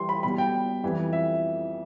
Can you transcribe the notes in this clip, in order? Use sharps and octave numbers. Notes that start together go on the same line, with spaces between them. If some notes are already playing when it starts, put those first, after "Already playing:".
Already playing: E3 G3 C6
B5
B2 G3 B5
G5
F2 E3 G3
E5